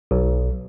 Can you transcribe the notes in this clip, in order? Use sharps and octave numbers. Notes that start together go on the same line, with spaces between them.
B1